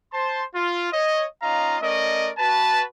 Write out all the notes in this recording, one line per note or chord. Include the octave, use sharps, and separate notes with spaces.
C5 A5 C6
F4
C#5 D#5
C#4 D#4 F4 D#5 F5 A#5
A3 C#4 A#4 D5 D#5
F#4 B4 A5